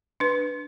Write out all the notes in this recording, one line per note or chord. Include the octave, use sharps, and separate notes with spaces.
D4 B4